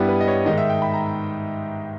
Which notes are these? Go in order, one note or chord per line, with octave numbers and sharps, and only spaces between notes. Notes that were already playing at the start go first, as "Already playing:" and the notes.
Already playing: G2 G3 B3 E4
B4
D#5
C#5
G#2 D#3 G#3 D#4 D#5
E5
G5
B5
A#5